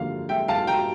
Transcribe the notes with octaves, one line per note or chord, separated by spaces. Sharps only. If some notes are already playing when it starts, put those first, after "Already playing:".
Already playing: G2 D3 F3 A#3 F5
E5 G5
F5 A5
G5 A#5